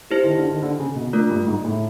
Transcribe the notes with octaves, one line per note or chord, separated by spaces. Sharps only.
E4 G4 C5
D#3
D3
D#3
D3
C#3
B2
A3 D4 F4 A#4
G2
G#2
A2